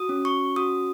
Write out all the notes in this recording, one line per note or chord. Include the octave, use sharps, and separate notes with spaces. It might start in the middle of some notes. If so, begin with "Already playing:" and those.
Already playing: F#4 D#6
C#4
C#6
F#4 D#6